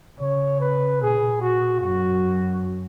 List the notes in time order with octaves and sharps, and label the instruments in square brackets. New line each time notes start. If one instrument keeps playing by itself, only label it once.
[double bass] C#3 [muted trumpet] C#5
[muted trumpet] B4
[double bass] A#2 [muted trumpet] G#4
[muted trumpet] F#4
[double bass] F#2 [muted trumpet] F#4